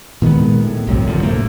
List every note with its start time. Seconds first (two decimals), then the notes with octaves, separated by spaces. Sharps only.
0.22 A#2 D#3 G#3 B3
0.64 A2
0.87 B1 F#2 C3
1.06 F#2 D3 F3
1.23 A2 C3 A3 A#3